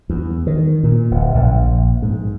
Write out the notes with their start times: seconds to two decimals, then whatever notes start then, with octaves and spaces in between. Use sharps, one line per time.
0.09 E2
0.47 D#3
0.83 A#2
1.11 D1
1.35 A#1
2.02 G#2